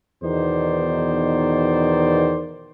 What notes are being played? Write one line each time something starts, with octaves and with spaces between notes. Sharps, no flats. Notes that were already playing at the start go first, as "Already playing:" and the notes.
E2 B2 D#3 D#4 C5 D5